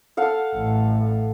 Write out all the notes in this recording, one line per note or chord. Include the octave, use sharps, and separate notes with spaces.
A4 F5 F#5
A1